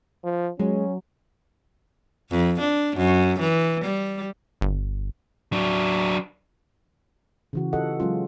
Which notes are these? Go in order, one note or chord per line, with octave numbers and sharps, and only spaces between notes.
F3
F#3 G#3 C#4
F2
D4
F#2
E3
G3
G1
F#3 D4
C#3 E3 F#4
F4 G4 A4 D#5 F#5
F#3 G#3 C#4 F4